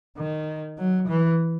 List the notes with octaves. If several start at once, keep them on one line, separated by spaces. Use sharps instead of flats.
D#3
F#3
E3